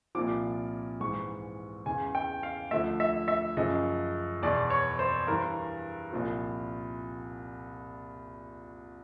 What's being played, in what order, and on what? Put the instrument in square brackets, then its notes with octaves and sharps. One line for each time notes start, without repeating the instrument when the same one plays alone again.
[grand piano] C2 A#2 F3 D6
G#2 E3 C#6
E2 C#3 E3 G#5
G5
F5
D2 D3 F3 E5
E5
E5
F#2 C#3 F3 D#5
E2 B2 D5
C#5
C5
G2 E3 A#4
C2 A#2 F3